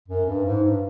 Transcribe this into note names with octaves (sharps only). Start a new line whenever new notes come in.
F#2
G2
G#2
G2